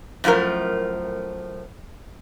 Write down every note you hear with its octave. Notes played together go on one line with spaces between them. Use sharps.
F#2 A2 F3 A3 A#4